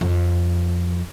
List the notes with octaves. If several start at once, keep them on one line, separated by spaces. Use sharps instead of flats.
F2